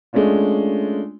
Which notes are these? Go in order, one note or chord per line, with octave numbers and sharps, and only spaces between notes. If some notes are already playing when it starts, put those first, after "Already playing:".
G#3 A3 C#4 D4 F4